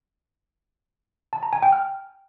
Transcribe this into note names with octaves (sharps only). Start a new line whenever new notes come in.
A5
A#5
G#5
G5
F6